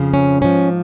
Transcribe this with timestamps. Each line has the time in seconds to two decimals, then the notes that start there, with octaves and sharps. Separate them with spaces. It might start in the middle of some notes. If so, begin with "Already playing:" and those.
Already playing: F2 C#3 F3
0.14 C#4
0.42 G#2 F3 C#4